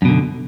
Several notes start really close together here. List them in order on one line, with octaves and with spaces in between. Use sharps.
F#2 B2 D3